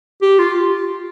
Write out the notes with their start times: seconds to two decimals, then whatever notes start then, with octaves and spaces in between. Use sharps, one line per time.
0.22 G4
0.39 F4